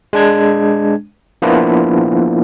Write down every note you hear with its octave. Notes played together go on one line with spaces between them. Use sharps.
G#3 D4 G#6
F3 A#3 B3 D4 E4 F4